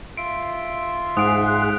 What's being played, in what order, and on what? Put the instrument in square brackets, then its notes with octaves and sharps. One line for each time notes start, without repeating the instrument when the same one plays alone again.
[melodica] F4 E5 C6 [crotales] D7
[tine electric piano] G#2 [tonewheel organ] G#4 F#5 [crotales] D#6 D7